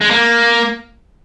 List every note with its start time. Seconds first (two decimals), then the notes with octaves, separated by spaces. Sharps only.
0.01 G#3
0.10 A#3